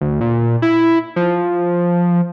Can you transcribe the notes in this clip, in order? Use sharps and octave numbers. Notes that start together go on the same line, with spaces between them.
D2
A#2
E4
F3